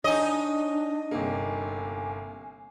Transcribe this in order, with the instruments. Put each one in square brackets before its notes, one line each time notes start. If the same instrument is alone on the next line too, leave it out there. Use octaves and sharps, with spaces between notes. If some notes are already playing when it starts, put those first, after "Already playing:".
[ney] D4 [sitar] D#4 D#5 [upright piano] C#5 G#5
[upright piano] G1 C3 A#3 [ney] G#5